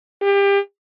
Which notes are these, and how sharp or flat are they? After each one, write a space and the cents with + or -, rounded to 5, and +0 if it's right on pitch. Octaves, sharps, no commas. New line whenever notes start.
G4 +30